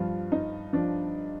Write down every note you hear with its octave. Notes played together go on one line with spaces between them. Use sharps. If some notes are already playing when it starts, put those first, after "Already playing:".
Already playing: G2 F3 F4
D#4
F3 D4